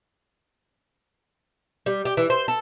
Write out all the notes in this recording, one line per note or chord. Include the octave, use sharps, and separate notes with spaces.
G3
G4
E3
C5
A4